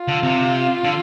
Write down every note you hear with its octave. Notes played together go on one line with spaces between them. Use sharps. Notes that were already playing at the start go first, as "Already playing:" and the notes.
Already playing: F4
D3
C3
D3